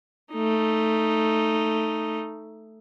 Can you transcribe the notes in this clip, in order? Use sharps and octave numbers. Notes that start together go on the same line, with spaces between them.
A3 D#4